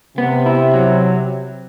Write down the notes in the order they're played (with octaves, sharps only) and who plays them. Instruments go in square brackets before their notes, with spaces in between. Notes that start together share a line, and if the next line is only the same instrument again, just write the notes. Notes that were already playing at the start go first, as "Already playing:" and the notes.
[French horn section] C3 [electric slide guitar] B3
[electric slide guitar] E4
F#3